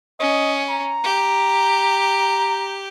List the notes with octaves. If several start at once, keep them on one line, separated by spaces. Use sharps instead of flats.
C#4 D#5
A#5
G4